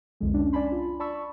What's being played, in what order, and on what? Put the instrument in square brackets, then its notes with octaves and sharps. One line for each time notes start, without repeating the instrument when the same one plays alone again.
[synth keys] C2 F2 D3 G#3
C#4 D4
D4 D5 G#5 A5 B5 C6
F4
D5 A5 B5 C#6 E6